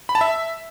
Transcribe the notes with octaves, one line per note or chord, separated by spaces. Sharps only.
B5
A5
E5